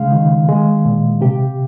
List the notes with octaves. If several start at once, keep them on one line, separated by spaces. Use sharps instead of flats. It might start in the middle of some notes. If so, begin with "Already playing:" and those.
Already playing: C#3 G#3 F5
D#3
G#3
A#2
C3 G4